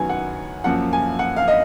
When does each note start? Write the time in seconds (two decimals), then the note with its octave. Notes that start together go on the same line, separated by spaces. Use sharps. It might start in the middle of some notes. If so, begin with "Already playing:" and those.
Already playing: F#2 D#3 F#3 B3 G#5
0.09 F#5
0.64 F#2 F3 A#3 F#5
0.93 G#5
1.19 F#5
1.36 F5
1.48 D#5